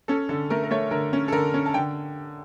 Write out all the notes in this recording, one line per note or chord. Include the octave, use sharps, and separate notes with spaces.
C#4 A4
D3 A4
A3 A#4
A#4
A3 C#5
D3 A#4
C#4
A4
D3 A#4
C#4
A5
D3 G5